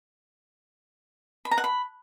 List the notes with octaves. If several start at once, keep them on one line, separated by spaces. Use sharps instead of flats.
B5
A#5
F#5
B5